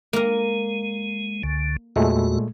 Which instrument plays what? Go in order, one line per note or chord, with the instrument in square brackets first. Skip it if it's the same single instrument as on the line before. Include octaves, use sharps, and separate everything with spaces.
[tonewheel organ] G#3 [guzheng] A#3 A#4
[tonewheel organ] C#2 D3
[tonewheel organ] E2 F#4 [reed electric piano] A#2 G#3 A3